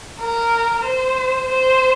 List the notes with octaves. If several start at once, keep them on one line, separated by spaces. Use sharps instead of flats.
A#4
C5
C5